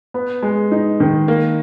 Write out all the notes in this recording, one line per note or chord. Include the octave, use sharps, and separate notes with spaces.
B3
G#3
D#4
D#3
A#3